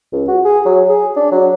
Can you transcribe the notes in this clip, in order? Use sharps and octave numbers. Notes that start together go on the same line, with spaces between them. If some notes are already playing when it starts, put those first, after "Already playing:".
C#2
F#4
G#4
F#3
G#4
D4
F#3